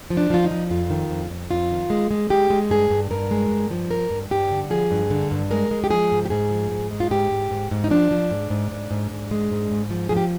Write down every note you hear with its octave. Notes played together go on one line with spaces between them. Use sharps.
F3
D4
F3 F4
D#4
F3
F2 F4
D#3
F2
F2
F2 F4
D#3
G#3
G#3
G#3 G4
G#3
G2 G#4
G2
G2 A#4
G#3
G2
F3
G2 A#4
G2
G2 G4
D3
F3 G#4
G2
D3
G2
G#3 A#4
G#3
G4
F3 G#4
G#2
G4
G#2 G#4
F3
G#2
G#3
F4
G#2 G4
G#2
G#2
G#2
D#4
F3 D4
F3
G#2
G#2
G#2
G#2
G#2
G#3
G#2
G#2
F3
F3 G#4
G4